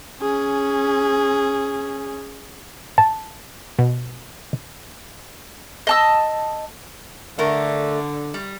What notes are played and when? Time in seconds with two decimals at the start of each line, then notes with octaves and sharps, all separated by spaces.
0.22 C#4 G#4
2.98 A5
3.79 B2
5.87 D#5 A5 E6
7.39 D3 A3 A#4
8.34 G3